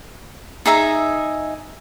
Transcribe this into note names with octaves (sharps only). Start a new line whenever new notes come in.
D#4 G#4 E5 A#5